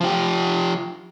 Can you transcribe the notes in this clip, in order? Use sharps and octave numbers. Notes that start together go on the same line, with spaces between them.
F3 G4